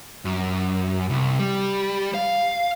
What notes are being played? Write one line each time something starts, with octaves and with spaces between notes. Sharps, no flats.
F#2
C2
G3
F5